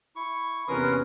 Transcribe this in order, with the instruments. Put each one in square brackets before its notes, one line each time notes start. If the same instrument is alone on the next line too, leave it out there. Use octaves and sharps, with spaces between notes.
[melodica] E4 C#6
[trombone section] E2 C3 C#4 [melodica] A#4 C6 D#6 [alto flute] B4